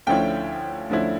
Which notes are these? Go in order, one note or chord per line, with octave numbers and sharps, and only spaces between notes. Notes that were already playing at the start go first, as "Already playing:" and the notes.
D2 D3 F3 C#4 E4 G5
D2 D3 F3 C#4 E4